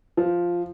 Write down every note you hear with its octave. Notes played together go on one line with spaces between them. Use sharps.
F3